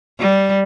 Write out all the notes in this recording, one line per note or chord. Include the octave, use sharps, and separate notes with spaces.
G3